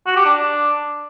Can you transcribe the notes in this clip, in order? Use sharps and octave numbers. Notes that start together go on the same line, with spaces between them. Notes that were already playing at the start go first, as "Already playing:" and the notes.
F#4
G4
D4